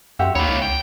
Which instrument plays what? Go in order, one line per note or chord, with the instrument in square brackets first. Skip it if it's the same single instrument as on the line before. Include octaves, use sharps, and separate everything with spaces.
[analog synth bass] F#2 [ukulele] F#4 G4 F#5 [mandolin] E5 C6
[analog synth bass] D#2 [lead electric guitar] A#3 C#5 [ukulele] D#4 [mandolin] B5
[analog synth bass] C#2
[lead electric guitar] G5